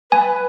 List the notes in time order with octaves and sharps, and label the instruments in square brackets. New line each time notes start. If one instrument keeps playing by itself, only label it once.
[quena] B4 [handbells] G#5